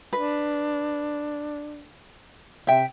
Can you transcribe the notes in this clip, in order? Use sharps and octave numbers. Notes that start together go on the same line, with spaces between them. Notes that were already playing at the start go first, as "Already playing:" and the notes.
D4 B4
C3 E5 G5